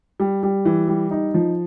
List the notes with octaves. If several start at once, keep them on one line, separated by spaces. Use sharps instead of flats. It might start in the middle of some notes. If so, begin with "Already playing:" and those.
G3
G3
E3
G3
D#4
F3